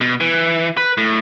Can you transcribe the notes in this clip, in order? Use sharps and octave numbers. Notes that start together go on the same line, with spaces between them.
B2
E3
B4
A2